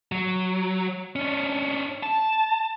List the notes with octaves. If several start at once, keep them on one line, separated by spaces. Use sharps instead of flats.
F#3
C#4 D4
A5